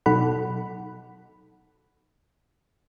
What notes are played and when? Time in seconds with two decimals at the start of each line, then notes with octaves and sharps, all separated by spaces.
0.06 B2 F#3 D#4 A4 F#5 B5